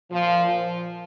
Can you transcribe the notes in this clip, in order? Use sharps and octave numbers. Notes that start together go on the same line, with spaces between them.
A#2 F3
F3